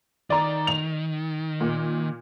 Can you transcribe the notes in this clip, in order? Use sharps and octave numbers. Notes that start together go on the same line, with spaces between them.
D#3 D5 A#5
F7
A#2